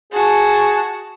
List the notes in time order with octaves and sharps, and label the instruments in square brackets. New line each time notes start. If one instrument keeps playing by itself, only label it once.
[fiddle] F#4 A5 [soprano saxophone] G#4